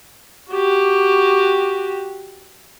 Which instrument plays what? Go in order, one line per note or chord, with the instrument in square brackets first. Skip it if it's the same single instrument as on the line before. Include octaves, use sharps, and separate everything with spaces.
[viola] F#4 G4